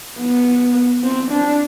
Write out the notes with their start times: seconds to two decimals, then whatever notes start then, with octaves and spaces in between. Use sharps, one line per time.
0.19 B3
1.03 C4
1.31 D4